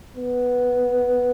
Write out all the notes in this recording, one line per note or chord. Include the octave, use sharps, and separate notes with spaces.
B3